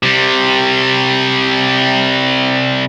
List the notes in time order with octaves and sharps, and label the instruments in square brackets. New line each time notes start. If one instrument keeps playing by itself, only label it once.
[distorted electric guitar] C3 G3